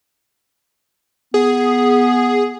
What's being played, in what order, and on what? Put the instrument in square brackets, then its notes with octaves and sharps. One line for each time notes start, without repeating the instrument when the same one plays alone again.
[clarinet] B3 [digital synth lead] G#4